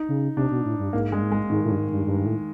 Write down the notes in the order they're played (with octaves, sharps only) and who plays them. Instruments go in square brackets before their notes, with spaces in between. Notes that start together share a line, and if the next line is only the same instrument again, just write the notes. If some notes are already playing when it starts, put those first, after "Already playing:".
Already playing: [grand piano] D#4
[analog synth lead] C#3
[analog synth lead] C3 [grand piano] D4
[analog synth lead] B2
A2
G2
[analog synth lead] G#2 [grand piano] A#3
[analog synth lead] G2 [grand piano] G#3
[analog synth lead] G#2
[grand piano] G#3
[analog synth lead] G#2 [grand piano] D#3
[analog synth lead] A2
G2
G#2
G2
G2
A2